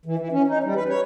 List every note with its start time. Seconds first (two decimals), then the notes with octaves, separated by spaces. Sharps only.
0.05 E3
0.19 E3
0.32 C#4
0.48 D#4
0.64 G3
0.75 B4
0.89 C#5